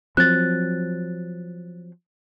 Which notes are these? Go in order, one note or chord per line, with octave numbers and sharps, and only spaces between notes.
F3 F#3 C4 F#6 A6